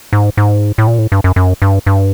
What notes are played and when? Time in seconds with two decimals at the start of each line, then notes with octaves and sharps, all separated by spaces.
0.13 G#2
0.37 G#2
0.78 A2
0.87 A#2
0.99 A2
1.12 G2
1.24 F#2
1.36 F#2
1.62 G2
1.86 G2